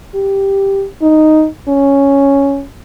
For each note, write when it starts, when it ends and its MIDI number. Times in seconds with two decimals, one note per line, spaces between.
0.15 0.85 67
1.03 1.46 63
1.69 2.64 61